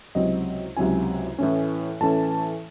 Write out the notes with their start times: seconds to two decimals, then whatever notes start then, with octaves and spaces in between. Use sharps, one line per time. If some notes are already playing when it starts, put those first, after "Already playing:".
0.15 C#2 C3 F#3 C4 E4 D#5
0.77 C#2 C3 F#3 C4 E4 G#5
1.39 A2 E3 A3 C#4
2.00 A2 E3 A3 C#4 A5